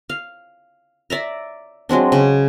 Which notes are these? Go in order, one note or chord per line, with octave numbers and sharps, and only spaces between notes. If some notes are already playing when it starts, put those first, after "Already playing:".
F5
D5 E5 A#5
F#3 G#3 C4 D4
C#3